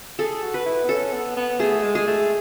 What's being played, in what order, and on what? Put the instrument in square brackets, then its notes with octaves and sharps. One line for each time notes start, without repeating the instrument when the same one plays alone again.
[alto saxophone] G#4 [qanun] A4
[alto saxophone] F#4
[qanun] B4
[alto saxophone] E4
B3
[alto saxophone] C#4 [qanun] A4
[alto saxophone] B3
B3
[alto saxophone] A3 [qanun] G#4
[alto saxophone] G#3
[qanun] G#4
[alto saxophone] A3